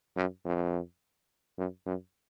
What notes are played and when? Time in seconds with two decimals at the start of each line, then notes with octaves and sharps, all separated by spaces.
0.16 F#2
0.45 F2
1.58 F#2
1.86 F#2